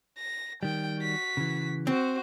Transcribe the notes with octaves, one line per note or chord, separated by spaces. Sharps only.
A#6
D#3 G3 G5
F#4 B6
C#3 E3
C4 F#4 C5